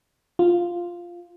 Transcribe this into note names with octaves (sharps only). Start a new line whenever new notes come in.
F4